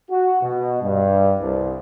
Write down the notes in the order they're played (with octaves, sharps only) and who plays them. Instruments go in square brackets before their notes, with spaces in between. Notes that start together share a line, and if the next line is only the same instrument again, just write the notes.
[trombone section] F#4
B2
G2
C2